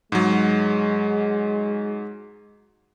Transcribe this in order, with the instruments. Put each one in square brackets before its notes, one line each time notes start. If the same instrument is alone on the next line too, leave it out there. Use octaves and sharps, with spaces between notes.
[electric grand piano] G#2 F#3 [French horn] G#3